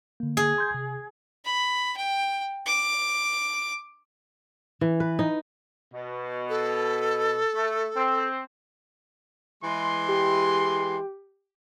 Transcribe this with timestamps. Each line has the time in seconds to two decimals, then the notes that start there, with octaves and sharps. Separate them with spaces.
0.20 D3 A#3
0.37 G#4
0.58 C6 G6 G#6
0.74 C3
1.45 B5
1.97 G5
2.66 D6
4.81 E3
5.00 B4
5.19 D#4
5.93 B2
6.49 A4
7.55 A3
7.96 C4
9.64 E3 G#3 C6
10.08 G4